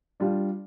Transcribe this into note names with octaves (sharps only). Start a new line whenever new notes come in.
G3 D4 F4